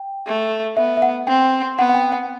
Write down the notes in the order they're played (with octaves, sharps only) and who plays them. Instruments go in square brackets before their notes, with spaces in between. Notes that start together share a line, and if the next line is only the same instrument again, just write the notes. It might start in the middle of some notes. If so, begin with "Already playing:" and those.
Already playing: [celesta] G5
[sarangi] A3
[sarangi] B3 [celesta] E5
[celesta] E5
F#5
[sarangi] C4 [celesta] G5
[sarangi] B3 [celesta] F#5
[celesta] F#5
G5
F#5